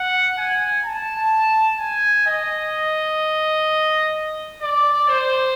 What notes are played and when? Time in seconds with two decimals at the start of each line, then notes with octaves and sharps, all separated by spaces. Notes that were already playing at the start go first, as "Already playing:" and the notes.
Already playing: F#5
0.38 G#5
0.85 A5
1.80 G#5
2.27 D#5
4.62 D5
5.09 C5